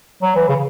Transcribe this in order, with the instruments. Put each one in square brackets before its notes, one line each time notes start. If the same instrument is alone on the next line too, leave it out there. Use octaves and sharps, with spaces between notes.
[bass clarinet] F#3
E3
C#3